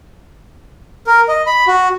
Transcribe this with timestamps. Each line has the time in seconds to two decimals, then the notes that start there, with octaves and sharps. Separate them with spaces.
1.07 A#4
1.28 D#5
1.47 B5
1.67 F#4